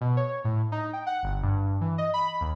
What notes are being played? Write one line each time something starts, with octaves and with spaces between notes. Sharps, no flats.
B2
C#5
A2
D#4
G5
F#5
G1
G2
E3
D#5
B5
D#2